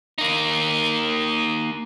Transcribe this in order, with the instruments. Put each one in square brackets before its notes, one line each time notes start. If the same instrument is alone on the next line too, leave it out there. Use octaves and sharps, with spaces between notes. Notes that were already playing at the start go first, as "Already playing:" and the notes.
[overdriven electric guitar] A#3 D#4